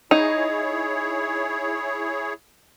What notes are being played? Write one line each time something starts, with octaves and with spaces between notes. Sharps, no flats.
D#4 E4 G#4 C#5